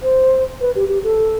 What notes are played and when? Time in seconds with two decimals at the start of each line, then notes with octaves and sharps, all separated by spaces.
0.03 C5
0.61 B4
0.75 G4
0.89 G4
1.03 A4